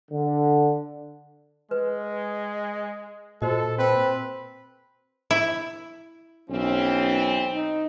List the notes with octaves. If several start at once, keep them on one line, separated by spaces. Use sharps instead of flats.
D3
G#3 B4
A#2 F#4 A4 C5 D#5
C4 B4
E4
B1 E3 C4 C#4
D#4